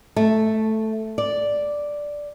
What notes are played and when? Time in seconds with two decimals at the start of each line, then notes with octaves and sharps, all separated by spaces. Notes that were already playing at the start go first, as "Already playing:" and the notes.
0.16 A3
1.18 D5